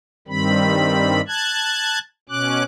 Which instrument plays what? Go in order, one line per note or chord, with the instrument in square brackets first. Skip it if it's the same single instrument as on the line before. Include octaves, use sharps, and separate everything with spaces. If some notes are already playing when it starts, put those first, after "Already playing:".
[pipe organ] G2 D#3 G3 C4 B5
A5 F#6 G#6
B2 C#4 D6 F#6